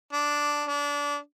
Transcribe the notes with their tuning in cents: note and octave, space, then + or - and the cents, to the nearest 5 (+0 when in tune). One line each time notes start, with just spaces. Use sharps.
D4 -5
D4 -25